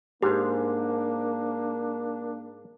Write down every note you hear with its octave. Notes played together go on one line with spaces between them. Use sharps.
G#2 A#3 D4 G4 C5